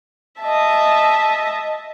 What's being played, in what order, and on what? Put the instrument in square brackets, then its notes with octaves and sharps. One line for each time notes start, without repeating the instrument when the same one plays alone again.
[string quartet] D#5 E5 A5